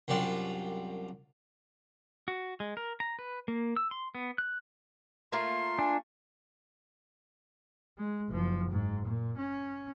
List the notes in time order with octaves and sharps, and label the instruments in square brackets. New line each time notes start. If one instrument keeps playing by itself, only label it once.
[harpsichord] C2 F#2 G3 D4 F4
[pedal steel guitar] F#4
G#3
A#4
A#5
B4
A#3
E6
C6
B3
F#6
[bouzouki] A3 A#3 F4 [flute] C6
[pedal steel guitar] D4 [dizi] G#5
[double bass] G#3
F#1 F3
G#2
A#2
C#4